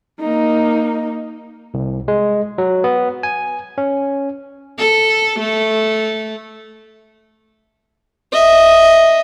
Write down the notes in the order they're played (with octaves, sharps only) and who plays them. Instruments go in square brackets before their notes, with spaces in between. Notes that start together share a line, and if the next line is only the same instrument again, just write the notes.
[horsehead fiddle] A#3 D#4
[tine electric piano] C2
G#3
F#3
B3
G#5
C#4
[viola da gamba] A4
A3
[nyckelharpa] D#5 E5